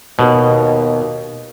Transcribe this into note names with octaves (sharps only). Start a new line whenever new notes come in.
D#2 B2